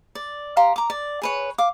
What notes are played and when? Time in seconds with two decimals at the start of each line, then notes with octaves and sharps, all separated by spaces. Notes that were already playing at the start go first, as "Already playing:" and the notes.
0.15 D5
0.57 G4 F5 A#5 C6
0.76 A#5 D6
0.90 D5
1.22 G#4 B4 C#5
1.58 F5 D6